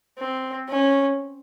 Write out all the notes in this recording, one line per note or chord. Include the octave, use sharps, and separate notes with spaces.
C4
C#4